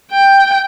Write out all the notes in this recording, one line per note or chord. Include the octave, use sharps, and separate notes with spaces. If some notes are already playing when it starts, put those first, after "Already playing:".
G5